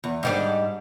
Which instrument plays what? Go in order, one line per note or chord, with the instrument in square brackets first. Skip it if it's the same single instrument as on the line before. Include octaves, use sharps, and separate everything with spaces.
[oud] E2
G#2 G3 D4